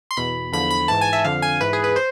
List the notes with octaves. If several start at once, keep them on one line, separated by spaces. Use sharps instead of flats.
C6
E2 B2 B5
E2 D3 F3 B5
B5
G#2 E3 A5
G#5
E5
F2 D3 F3 F5
G#5
G#2 E3 B4
G#4
B4
C5